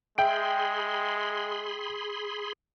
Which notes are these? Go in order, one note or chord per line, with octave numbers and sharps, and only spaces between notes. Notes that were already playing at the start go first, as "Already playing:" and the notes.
G#3 G#4 E5 G5 B5 C6 D7